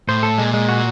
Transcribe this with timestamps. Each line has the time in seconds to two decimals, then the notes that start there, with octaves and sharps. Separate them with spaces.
0.08 A2 C5
0.23 A4
0.38 A#2 G#3
0.54 G#3
0.69 F#4